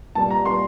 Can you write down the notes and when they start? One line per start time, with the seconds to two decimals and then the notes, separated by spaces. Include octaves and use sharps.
0.15 C2 A#2 G3 A5
0.31 A#5
0.45 A#2 G3 C6